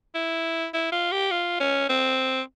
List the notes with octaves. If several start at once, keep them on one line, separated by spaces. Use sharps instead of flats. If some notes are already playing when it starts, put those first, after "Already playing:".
E4
E4
F4
G4
F4
C#4
C4